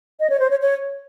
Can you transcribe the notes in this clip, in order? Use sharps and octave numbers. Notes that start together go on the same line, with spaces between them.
D#5
C#5
C5
C#5
C#5